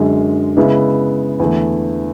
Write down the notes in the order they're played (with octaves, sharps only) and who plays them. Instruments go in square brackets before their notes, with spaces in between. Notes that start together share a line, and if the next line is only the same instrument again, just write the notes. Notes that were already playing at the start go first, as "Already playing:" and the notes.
Already playing: [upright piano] F#2 D3 G#3
C#3 G#3 B3 E4
E2 D3 A3